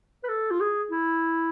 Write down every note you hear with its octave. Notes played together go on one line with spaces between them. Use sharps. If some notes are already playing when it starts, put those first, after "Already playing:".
B4
A4
F4
G#4
E4